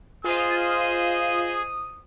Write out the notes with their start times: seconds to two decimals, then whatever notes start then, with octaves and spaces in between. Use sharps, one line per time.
0.24 F4 G#4 C5 D#5 D#6